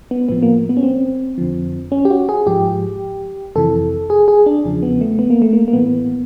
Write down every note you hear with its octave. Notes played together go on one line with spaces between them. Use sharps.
B3
A2 F3 B3
A#3
B3
C#4
C4
F2 D3 F3
C#4
G4
F#4
G#4
G#2 F3 G4
F2 C3 E3 A4
G#4
G#4
D4
E2 C#3 F3
B3
A3
B3
A#3
A3
A#3
A#3
A2 E3 B3